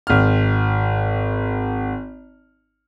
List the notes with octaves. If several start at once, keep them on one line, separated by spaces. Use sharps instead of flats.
G#1 F6